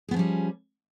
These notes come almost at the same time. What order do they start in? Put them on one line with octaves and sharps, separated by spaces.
G#4 B3 F3 C#4 G3